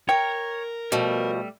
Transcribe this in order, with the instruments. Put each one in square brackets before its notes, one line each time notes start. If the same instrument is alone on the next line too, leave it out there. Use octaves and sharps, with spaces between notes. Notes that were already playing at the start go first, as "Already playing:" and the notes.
[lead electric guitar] A#4 A#5 [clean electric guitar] C#5 [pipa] G5
[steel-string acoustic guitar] B2 F3 [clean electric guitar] G3 A3